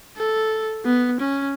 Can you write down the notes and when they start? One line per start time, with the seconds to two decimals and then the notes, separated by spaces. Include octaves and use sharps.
0.17 A4
0.86 B3
1.20 C#4